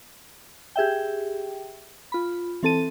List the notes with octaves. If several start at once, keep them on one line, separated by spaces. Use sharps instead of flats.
G4 G#4 E5 G5
F4 B5
E3 C4 A4 A5 D#7